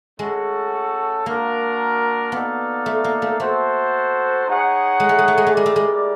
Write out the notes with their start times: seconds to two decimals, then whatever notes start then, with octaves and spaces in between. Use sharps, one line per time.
0.19 G#3 A3 C#4 F#4 A4
1.26 A#3 D4 F#4 A#4
2.32 B3 D#4 F#4 A4 D5 F5
2.86 A3
3.04 A#3
3.22 A3
3.40 A3 F#4 A4 C5
4.46 D#4 G#4 C#5 F#5
5.00 G#3
5.09 A3
5.18 G#3
5.28 A3
5.38 G#3
5.47 A3
5.53 G#3 E4 G4 A#4 D5
5.66 A3
5.76 G#3